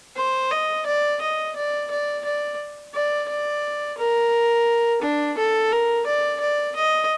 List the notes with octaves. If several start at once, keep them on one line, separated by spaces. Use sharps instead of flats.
C5
D#5
D5
D#5
D5
D5
D5
D5
D5
A#4
D4
A4
A#4
D5
D5
D#5